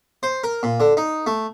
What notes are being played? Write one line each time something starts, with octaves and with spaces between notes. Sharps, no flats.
C5
A#4
A#2
D3
D#4
A3